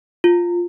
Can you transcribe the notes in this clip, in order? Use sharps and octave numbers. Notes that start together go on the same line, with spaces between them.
F4